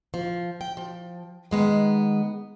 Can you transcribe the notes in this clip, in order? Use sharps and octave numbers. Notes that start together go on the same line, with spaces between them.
F3
G5
F3
D#3 G#3 B3